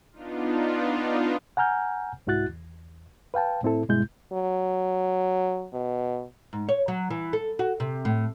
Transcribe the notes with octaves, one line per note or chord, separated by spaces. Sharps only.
B3 D4 D#4 F4
F#5 G#5 A#5 F6 G6
C2 G#2 E4 F#4 F#6 A6
E2
B4 F5 G5 A5
A2 C4 E4 A4
G2 B2 G3 G#3 E4 G6
F#3
B2
G#2
C#5
F#3
E3
A4
F#4
C3
A2